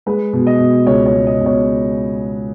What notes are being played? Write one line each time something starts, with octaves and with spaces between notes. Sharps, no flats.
G#3 B4
B2
D#5
B2
C#2 C#5
C#5
G#3
D#5
B2
C#5